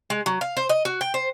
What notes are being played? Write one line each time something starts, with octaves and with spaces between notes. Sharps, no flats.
G#3
F#3
F5
C5
D#5
F#4
G5
C5